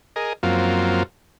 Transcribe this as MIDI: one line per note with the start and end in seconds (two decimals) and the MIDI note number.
0.16 0.33 68
0.16 0.33 70
0.16 0.33 75
0.43 1.03 42
0.43 1.03 53
0.43 1.03 54
0.43 1.03 58
0.43 1.03 60
0.43 1.03 65